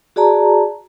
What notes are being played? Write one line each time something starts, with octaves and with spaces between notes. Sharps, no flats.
F#4 G#4 D5 A5 A#5